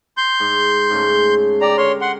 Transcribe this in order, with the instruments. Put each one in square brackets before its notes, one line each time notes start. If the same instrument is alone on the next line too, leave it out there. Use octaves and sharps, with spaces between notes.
[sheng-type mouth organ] C6 G6
[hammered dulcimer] G#2
G#2 C#3 A3
[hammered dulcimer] G4 [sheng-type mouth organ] D5 A#5
[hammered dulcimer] D3 A#4 [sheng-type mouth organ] C#5 C6
[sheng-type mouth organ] F#5 C6